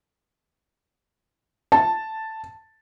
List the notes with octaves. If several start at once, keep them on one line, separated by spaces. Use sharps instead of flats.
A5